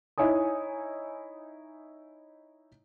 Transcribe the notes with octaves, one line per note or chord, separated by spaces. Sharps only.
D#4 E4 C#5 G#5 D#6